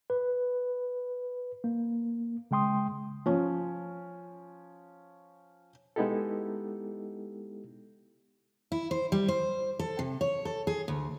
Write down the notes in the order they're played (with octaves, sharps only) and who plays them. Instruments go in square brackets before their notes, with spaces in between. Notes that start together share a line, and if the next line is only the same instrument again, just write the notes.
[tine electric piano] B4
A#3
C#3 G#3 G5 C6 D#6
[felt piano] F3 C#4
[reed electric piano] G#3 B3 D#4 E4 G4 A4
[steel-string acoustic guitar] E4
C5
G3
C5
A4
C3
C#5
A4
G#4
D2